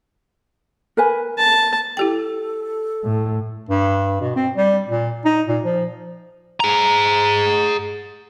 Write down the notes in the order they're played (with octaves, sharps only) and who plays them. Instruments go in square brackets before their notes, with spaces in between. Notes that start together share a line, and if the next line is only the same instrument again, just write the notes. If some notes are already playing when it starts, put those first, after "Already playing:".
[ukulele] A#4 B4 G#5
[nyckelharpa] A5
[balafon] E4 G4 G5 [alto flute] A4
[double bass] A2
[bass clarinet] G2
B2
C4
G3
A#2
D#4
A#2
F3
[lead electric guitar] G#4 A#5